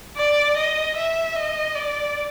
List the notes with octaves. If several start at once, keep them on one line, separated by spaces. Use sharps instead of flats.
D5
D#5
E5
D#5
D5